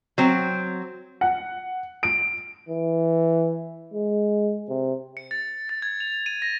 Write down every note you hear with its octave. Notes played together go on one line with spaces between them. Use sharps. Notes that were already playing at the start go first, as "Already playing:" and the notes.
F#3 C4
F#5
D7
E3
G#3
C3
C#7
A6
A6
G#6
F7
D#7
A#6